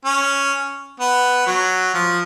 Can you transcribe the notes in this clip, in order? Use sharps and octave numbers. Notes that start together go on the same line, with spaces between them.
C#4
B3
F#3
F3